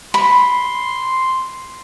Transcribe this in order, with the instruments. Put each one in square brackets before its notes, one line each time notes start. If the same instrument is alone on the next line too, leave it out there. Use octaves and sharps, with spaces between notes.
[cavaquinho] B5 [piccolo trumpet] C6